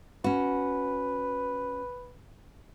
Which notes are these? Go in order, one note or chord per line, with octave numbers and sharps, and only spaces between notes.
C#4 F#4 B4